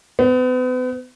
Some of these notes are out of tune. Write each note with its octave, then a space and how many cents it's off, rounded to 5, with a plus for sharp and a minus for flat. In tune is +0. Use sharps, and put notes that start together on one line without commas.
B3 +40